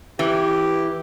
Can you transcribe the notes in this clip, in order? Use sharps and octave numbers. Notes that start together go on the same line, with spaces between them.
E3 G4